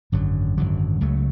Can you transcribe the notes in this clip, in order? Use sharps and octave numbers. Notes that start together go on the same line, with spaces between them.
G#1 F#2 D3 F#3
G#1 F#2 D3 F#3
C#2 C#3 F#3 A3